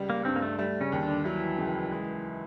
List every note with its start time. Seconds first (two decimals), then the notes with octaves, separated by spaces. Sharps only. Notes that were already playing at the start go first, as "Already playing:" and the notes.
Already playing: C#2 G3
0.10 A#3
0.25 G2 C4
0.36 A#3
0.42 A3
0.59 G3 A3
0.81 C#3 C#4
0.92 D#2
1.02 D3 D4
1.24 E3 F#3 E4
1.58 C#2
1.91 G#3